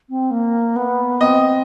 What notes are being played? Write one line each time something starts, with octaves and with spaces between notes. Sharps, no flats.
C4
A#3
B3
C4 D#5